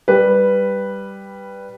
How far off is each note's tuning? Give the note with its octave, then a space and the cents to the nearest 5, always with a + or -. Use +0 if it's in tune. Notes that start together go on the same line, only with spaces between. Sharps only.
G3 +0 B4 +0